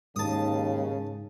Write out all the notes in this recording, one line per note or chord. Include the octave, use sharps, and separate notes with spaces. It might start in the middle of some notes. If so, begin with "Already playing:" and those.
D#2 G#2 C#3 A5 D#6